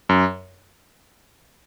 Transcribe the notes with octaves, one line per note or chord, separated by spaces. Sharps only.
F#2